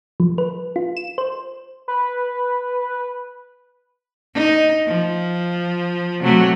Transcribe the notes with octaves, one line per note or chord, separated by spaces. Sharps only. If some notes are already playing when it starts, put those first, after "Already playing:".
F3
B4
F4
E7
C5
B4
D#4
F3
C3 F#3 A3